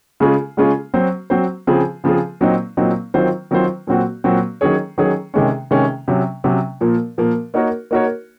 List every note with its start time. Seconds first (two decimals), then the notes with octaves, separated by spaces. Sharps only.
0.20 C#3 G#3 C#4 F4 G#4
0.57 C#3 G#3 C#4 F4 G#4
0.94 F#3 C4 F#4 C5
1.30 F#3 C4 F#4 C5
1.67 C#3 F3 C4 F4 G#4
2.04 C#3 F3 C4 F4 G#4
2.41 A#2 F#3 C4 D#4
2.77 A#2 F#3 C4 D#4
3.14 D#3 F#3 C4 F4 C5
3.51 D#3 F#3 C4 F4 C5
3.87 A#2 F#3 C4 F#4
4.24 A#2 F#3 C4 F#4
4.61 D#3 F#3 C#4 G#4 C#5
4.98 D#3 F#3 C#4 G#4 C#5
5.34 C3 D#3 G#3 C#4
5.71 C3 D#3 G#3 C#4
6.08 C3 F#3 C#4
6.44 C3 F#3 C#4
6.81 A#2 F3 A#3
7.18 A#2 F3 A#3
7.54 A#3 D#4 F#4 A#4 C#5
7.91 A#3 D#4 F#4 A#4 C#5